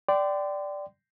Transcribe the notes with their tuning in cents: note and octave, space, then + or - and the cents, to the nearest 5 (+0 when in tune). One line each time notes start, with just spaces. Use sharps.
D5 +0 G5 -20 C6 -30